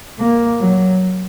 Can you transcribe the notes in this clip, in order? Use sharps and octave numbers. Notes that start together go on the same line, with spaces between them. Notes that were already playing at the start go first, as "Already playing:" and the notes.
A#3
F#3